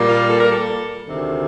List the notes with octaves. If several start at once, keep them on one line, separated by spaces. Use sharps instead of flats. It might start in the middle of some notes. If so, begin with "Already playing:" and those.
Already playing: A#2 G3 A#3
F4
A4
A#4
A4
D2 C3 D#3